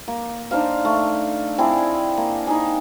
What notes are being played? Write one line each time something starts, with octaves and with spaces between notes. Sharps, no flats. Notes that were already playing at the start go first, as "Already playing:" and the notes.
A#3
D4 D#4 C5 F5
A3
C4 D4 E4 G#4
A#3
D#4 G#4